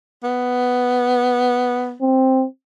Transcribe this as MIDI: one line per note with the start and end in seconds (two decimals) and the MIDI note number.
0.23 1.95 59
2.01 2.44 60